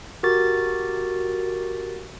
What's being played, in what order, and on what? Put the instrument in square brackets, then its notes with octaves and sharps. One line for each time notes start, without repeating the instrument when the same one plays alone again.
[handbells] F#4 G4 A#4 A6